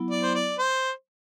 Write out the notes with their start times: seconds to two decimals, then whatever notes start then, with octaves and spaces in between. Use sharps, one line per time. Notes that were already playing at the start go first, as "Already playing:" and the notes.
Already playing: F#3 B3 E4
0.11 D5
0.23 C5
0.35 D5
0.59 C5